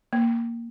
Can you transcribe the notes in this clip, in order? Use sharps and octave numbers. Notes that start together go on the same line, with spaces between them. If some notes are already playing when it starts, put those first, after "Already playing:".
A#3